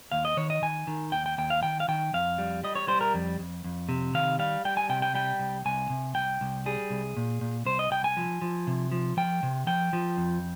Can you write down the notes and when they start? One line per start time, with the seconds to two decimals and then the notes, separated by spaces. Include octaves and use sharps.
0.12 D#2 F5
0.25 D#5
0.37 D#3 C#5
0.50 D#5
0.62 D#3 G#5
0.87 D#3
1.12 D#2 G5
1.26 G5
1.38 D#2 G5
1.50 F5
1.63 D#3 G5
1.80 F5
1.88 D#3 G5
2.13 F2 F5
2.38 G3
2.64 G3 D#5
2.75 C#5
2.88 G3 C5
3.01 A#4
3.14 F2
3.39 F2
3.64 F2
3.89 C3
4.14 D#3 F5
4.39 G3 F5
4.65 G3 G5
4.77 G#5
4.89 C3 G5
5.02 G5
5.14 G3 G5
5.39 C2
5.66 C2 G#5
5.90 C3
6.15 C2 G5
6.41 C2
6.66 G3 G#4
6.90 C2
7.17 A#2
7.41 A#2
7.66 C2 C5
7.79 D#5
7.91 C2 G5
8.04 G#5
8.17 F3
8.42 F3
8.67 C3
8.92 F3
9.17 F3 G5
9.43 C3
9.67 F3 G5
9.93 F3
10.17 F2